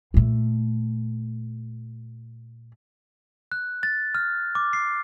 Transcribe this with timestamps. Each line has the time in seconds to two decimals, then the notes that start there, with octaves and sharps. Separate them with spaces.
0.14 A#2 A3
3.52 F#6
3.83 A6
4.15 F6
4.55 D6
4.73 C7